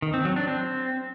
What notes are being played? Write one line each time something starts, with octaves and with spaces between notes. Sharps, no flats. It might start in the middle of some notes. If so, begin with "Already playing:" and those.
D#3
C4
F#3
D4
C4